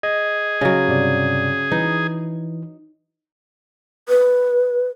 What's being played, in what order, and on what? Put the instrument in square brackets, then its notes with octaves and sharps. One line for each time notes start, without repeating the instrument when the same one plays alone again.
[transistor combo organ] G#4 [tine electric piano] D#5
[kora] C#3 F#3
[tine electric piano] G2 C3 D5
[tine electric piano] E3 [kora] D#4
[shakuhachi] B4